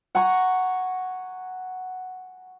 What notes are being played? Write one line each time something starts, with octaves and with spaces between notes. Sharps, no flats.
F#5 G#5 A#5 C#6